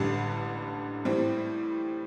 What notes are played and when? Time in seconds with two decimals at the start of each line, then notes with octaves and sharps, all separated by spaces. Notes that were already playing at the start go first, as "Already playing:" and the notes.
Already playing: A1 G2 D3 G3
1.05 A2 E3 G3 C4